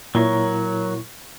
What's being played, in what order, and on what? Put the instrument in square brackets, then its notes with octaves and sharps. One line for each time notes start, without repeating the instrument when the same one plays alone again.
[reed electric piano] A#2 E4 [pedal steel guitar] F#3 A#4 C#5